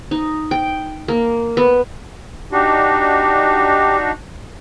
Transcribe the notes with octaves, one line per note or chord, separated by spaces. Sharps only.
D#4
G5
A#3
B3
D4 D#4 F#4 G4